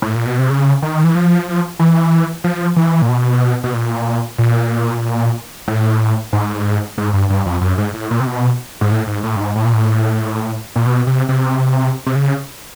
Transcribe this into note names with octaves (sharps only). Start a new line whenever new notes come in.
A2
A#2
B2
C3
C#3
D#3
E3
F3
E3
F3
E3
A#2
B2
B2
A#2
A#2
A2
G#2
G#2
G2
G2
F2
F#2
G#2
A2
A#2
C3
B2
G#2
A2
G#2
A2
G2
G#2
A2
A#2
A2
A#2
B2
C3
C3
C3
C#3